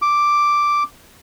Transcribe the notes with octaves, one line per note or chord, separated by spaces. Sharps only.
D6